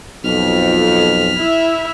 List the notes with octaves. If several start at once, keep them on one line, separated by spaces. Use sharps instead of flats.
B1 F2 F6 B6
E4 E5